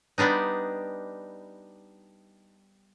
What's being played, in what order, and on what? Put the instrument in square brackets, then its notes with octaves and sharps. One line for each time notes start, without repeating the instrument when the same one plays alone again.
[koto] G3 B3 D4 D#4